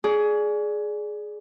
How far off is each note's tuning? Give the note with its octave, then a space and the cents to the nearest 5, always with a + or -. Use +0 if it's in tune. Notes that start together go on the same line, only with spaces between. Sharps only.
G#4 +15 D5 +0 C#6 +40